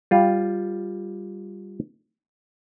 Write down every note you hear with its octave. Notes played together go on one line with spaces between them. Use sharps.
G3 F4